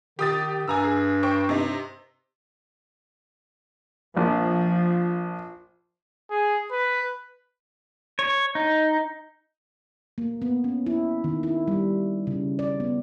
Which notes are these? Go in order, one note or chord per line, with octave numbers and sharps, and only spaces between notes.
D#3 G4 D#6 A6
G2 G#5 A#5 E6
G#4
C5 G5 C#6
C3 D#4
A#1 F3
G#4
B4
C#5
D#4
A#3
B3
C#4
E4
D#3
E4
G3
C#3
D5
B3